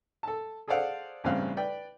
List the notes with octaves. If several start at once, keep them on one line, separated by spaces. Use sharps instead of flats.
A4 A5
G#4 A4 C5 D5 F5 F#5
A1 G2 C#3 C4 F5 F#6
B4 D5 G5